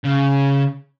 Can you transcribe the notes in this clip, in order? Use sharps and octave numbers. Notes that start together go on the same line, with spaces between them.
C#3